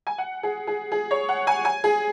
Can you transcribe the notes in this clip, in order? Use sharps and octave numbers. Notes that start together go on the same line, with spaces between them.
G#5
F#5
G#4
G#4
G#4
C#5
F#5
G#5
G#5
G#4